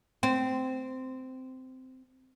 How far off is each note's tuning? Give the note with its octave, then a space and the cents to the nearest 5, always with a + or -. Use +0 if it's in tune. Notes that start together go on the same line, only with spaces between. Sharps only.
C4 -15